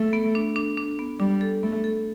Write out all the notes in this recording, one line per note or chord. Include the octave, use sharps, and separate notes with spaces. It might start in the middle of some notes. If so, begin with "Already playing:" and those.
Already playing: A3 A4
B3
D4
D4
D4
B3
G3 D4
A4
A3 B3
A4